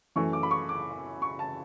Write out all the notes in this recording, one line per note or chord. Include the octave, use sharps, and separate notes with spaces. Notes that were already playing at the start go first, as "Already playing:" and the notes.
F#2 E3 A3 C#6
D6
B5
C#6
D6
C#6
A5